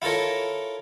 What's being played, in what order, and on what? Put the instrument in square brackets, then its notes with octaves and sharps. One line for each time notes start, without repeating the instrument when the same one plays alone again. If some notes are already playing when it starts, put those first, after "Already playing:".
[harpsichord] E4 F4 A4 A#4 C#5